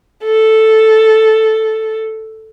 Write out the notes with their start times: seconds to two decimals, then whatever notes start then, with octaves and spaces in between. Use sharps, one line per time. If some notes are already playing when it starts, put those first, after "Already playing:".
0.24 A4